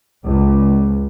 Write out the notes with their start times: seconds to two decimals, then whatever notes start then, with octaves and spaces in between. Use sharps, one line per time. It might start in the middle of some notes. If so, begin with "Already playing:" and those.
0.24 C#2